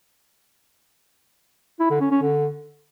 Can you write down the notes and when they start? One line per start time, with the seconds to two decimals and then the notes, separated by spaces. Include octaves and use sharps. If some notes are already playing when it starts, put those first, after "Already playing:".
1.80 E4
1.90 D3
2.01 C#4
2.11 C#4
2.22 D3